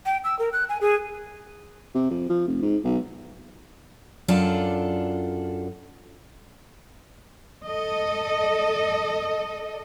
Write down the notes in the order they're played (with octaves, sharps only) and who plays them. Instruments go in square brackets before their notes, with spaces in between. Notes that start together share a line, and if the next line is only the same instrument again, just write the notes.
[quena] G5
E6
A#4
F#6
G#5
G#4
[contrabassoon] C3
F2
F3
F1
G#2
B1
[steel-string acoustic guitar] F#2 D4 F4 A4 D5 A5
[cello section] A4 D#5